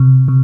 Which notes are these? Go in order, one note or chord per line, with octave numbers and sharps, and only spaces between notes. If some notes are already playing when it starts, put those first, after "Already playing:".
Already playing: C3
C3